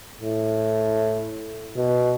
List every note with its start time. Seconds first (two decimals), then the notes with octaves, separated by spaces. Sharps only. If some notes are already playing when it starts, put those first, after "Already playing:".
0.21 A2
1.77 B2